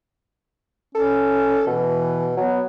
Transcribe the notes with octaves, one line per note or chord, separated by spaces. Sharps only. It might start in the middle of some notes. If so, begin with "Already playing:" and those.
C#4 A4
B2 E3
F#3 B3